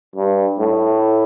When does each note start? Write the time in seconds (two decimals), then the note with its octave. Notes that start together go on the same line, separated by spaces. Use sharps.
0.16 G2
0.59 A2